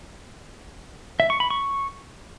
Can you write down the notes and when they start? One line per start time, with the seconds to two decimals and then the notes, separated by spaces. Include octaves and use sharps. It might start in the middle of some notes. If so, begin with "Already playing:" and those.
1.20 E5
1.30 C#6
1.40 B5
1.50 C#6